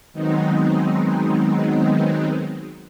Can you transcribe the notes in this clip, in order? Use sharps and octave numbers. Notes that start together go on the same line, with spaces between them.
D#3 F#3 G#3 B3 C4 D#4